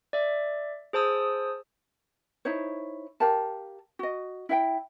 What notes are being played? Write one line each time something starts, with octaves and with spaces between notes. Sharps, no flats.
D5 E5
G#4 C5 A5 D#6 E6
D#4 E4 C5 C#5
G4 A#4 F5 A5
F#4 D#5
E4 E5 F5 G5